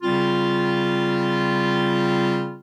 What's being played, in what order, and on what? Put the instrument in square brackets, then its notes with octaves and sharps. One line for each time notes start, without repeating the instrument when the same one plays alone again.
[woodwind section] C#3 G3 C4 F4